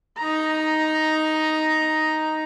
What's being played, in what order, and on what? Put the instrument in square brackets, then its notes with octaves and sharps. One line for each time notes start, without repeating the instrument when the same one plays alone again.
[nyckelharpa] D#4 A#5